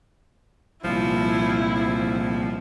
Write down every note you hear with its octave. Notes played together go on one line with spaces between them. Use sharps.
C2 A#2 F3 E4
F3